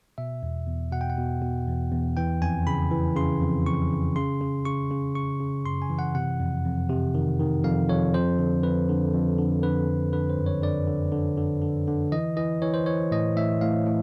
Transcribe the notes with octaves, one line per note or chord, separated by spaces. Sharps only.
B2 E5
E2
E2
B2 F#5
G5
F#5
B2
B2
E2
E2
E3 G5
F2 G#5
C#3 B5
E3
C#3 C6
F2
F2 C#6
C#3
C#3 C6
C#3
C#3 C#6
C#3
C#3 C#6
C#3
F#2 C6
G#5
E3
F#5
C3 F#5
F2
F2
C3
D#3
D#3
F2 F5
F2 C#5
F2 C5
D3
F2 B4
D3
F2
D3
D3 B4
F2
D3 B4
C5
F#2
C#5
D3 D5
D3
D3
D3
D3
D3
E3 D#5
E3 D#5
E3 C#5
C5
E3 C#5
A2 D#5
A2 E5
A2 F5
A2